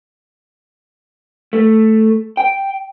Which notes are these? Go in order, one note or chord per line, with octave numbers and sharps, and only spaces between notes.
A3
G5